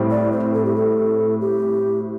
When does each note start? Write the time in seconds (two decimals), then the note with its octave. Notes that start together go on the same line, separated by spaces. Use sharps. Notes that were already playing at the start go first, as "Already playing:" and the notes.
Already playing: A2 G3 C4
0.11 D5
0.32 C5
0.54 A4
0.65 G4
0.76 A4
1.41 G4